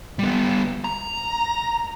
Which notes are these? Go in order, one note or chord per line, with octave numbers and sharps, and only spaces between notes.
G3 B3
A#5